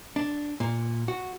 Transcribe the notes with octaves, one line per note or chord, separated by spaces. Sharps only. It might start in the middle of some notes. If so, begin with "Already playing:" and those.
D4
A#2
F#4